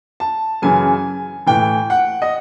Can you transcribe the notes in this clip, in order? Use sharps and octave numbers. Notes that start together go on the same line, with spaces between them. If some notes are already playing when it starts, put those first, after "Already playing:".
A5
F#2 C#3 E3 G#5
A2 E3 G5
F#5
D#5